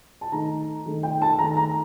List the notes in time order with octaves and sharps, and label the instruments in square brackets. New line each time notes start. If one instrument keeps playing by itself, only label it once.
[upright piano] A5
D#3 A3 D#4 A#5
D#3 A3 D#4
G5
A5
D#3 A3 D#4 A#5
A#5